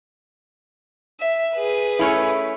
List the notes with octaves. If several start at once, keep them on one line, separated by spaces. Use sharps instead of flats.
E5
G#4 B4
A3 C#4 E4